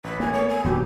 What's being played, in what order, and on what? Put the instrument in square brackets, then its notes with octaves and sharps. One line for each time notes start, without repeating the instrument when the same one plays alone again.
[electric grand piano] A1 [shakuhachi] B4
[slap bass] A#3 [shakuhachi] G#5
[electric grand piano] A3 B3 [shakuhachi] C#5
[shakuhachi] G#5
[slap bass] E1 A#2 D#3 [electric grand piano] F#3 B3 [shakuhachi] G4